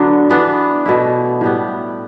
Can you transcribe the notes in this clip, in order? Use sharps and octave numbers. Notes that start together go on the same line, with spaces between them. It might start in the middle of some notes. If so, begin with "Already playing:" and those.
Already playing: D3 F#3 B3 D4
E3 B3 D4
B2 A3 E4
A2 G3 B3